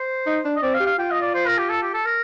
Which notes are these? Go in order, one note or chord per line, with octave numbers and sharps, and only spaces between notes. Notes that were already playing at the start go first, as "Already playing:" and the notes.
Already playing: C5
D#4
D4
D#5
C4 D5
F5
G4
F5
F4 G5
D#5
D5
C5
A#4
G4
A4
G4
A4
A#4